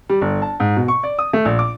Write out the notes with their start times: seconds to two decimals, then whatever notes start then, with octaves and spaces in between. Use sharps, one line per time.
0.09 G3
0.22 G1
0.42 A5
0.60 G#2
0.77 B2
0.88 C#6
1.03 D5
1.19 D#6
1.33 A3
1.45 A#1
1.59 D6